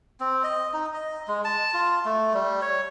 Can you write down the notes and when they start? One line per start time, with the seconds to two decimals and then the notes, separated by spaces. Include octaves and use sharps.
0.20 C4
0.44 D#5
0.74 D#4
0.94 D#5
1.28 G#3
1.45 A5
1.74 F4
2.05 A3
2.34 G3
2.62 C#5